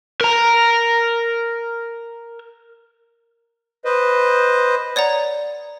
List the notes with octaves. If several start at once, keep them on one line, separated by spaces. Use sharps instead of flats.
A#4 A#5
B4 C5 D#5
C#5 D5 F#5 A#5